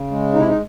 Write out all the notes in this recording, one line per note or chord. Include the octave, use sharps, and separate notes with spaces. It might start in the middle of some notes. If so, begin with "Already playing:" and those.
Already playing: C#3
G#3
C3 D#4
E4
D#4